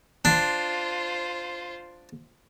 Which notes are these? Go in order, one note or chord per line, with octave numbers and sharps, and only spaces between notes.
D4 F4 C5